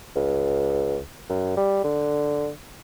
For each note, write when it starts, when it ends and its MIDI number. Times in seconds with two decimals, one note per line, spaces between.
0.16 0.98 37
1.30 1.56 42
1.57 1.83 55
1.84 2.49 50